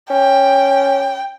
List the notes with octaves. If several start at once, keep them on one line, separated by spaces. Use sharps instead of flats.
C#4 G5